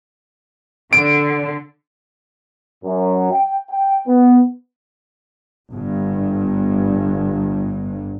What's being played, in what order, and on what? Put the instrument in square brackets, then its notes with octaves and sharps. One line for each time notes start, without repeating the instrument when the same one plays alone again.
[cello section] D3 [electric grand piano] D7
[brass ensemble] F#2
G5
G5
B3
[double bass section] G1 G2